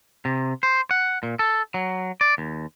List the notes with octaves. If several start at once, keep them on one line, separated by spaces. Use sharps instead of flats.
C3
C5
F#5
A#2
A4
F#3
D5
D#2